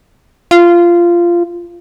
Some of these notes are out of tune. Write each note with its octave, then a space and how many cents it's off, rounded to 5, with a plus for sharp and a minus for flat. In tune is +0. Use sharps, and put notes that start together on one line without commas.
F4 -15